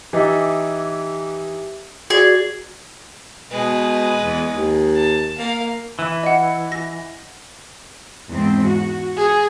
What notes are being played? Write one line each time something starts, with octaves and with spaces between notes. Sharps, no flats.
E3 D#4 G4 E5
F#4 G#4 D5
B2 G#3 B4
E2
D#2
A5
A#3 F5
E3
D#5 F#5
A#6
E2 G#2 C4
F#4
G#4